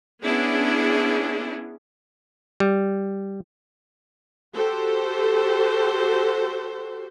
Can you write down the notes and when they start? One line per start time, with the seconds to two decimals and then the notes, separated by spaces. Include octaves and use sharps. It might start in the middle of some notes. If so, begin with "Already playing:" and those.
0.23 B3 C#4 D4 E4 G#4
2.60 G3
4.55 F#4 G4 A4 C5